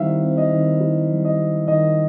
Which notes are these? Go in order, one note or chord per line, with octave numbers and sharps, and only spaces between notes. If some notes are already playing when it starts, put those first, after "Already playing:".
Already playing: D#3 G3 C4 E4 E5 F5
C4
D#5
D#3
E4
G3
D#5
C4
D#3 D#5